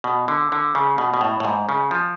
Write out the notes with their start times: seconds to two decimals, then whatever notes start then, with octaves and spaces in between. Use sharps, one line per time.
0.04 B2
0.28 D3
0.52 D3
0.75 C#3
0.98 B2
1.14 B2
1.21 A2
1.40 A2
1.45 G#2
1.69 C#3
1.91 F3